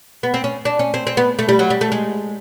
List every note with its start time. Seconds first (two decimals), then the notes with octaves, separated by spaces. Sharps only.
0.23 B3
0.34 C4
0.44 C#4
0.65 D4
0.79 C#4
0.94 C4
1.07 C4
1.17 B3
1.39 A3
1.49 G3
1.59 F#3
1.70 G3
1.81 A3
1.92 G#3